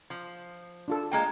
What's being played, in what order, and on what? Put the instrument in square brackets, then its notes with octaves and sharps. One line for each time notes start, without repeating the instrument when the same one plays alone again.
[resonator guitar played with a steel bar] F3
[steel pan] D4 F4 A4
[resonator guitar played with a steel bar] G#3 A#3 G5